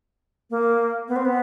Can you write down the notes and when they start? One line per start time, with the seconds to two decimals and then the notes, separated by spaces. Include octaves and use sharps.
0.50 A#3
1.08 B3
1.16 C4
1.25 B3